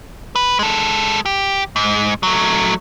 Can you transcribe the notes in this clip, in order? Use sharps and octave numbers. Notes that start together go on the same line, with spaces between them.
B4
G#3 A4
G4
G#2
F#3 A3